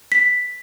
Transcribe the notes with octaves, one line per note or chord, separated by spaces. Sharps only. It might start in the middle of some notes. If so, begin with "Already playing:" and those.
B6